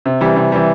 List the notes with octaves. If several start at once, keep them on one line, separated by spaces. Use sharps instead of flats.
C3
E3 G3
C3
E3 G3